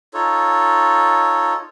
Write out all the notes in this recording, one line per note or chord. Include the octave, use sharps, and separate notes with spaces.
D#4 F4 A4 C#5